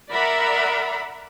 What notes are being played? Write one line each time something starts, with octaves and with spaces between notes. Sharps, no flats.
A#4 D5 E5 F#5 A#5 B5